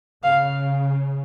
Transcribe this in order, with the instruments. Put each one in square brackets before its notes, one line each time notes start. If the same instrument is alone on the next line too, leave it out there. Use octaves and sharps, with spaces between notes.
[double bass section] C#3 [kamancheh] F5